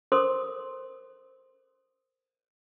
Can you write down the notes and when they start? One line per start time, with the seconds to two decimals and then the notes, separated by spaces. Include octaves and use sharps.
0.12 A4 A#4 C5 C6 D6 D#6